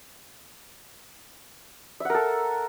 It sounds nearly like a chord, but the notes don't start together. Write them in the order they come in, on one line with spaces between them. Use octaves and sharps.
E5 F#5 A#4 A4